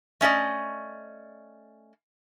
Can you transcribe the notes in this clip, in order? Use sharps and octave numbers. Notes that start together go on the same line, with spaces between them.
A3 C#4 D5 D#5